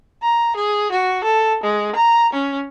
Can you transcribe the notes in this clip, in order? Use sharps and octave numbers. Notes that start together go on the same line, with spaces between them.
A#5
G#4
F#4
A4
G#3
A#5
C#4